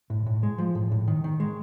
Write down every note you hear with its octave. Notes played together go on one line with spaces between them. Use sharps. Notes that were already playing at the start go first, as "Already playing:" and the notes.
A2
A2
G#3
F3
A2
A2
D#3
D#3
G#3